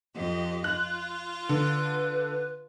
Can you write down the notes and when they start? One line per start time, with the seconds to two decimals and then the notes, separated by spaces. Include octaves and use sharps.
0.14 F2 G4 D#5
0.64 F4 F#6
1.49 D3 B4